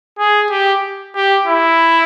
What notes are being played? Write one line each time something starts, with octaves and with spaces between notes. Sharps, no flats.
G#4
G4
G4
E4